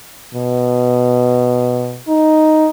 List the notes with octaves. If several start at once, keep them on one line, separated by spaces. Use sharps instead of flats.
B2
D#4